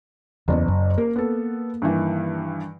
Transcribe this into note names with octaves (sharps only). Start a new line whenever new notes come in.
F#1 E2 E3 B3 D5
F#2
A#3 A#4
B3 A4
G2 D#3 E3